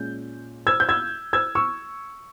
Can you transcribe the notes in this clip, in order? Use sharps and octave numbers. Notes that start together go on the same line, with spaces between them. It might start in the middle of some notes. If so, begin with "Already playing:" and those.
Already playing: A#2 G#3 C#4 G6
E6 G#6
G6
E6 G#6
E6 G#6
C#6 E6